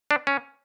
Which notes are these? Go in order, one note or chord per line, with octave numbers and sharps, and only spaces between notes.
D4
C#4